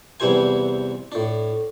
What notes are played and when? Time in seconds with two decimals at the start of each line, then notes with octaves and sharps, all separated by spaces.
0.20 E2 C3 E3 G3 C5 G#5
1.12 A2 D4